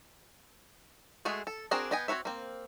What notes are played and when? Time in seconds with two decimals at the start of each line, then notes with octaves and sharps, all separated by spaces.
1.25 G#3 A3 F#4 G#4
1.47 A4
1.71 C4 D4 F#4 G#4 A#4
1.91 B3 D#5 G5 G#5
2.08 C4 F#4 B4 C#5 E5
2.25 A#3 C4